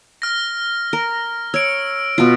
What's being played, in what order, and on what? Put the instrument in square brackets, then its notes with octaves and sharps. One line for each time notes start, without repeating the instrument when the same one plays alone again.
[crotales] F6 A#6
[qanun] A#4
[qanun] C#5 [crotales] E6 D7
[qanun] B2 F4